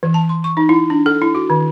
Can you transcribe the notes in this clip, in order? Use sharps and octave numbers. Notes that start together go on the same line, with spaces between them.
E3
A5
C6
C#6
D#4
E4
D4
A4
E4
F#4
D#3